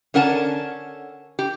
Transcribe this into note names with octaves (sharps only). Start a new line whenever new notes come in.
D3 C#4 A#4 F#5 G#5 A5
G4